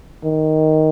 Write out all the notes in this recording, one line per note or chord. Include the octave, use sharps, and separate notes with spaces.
D#3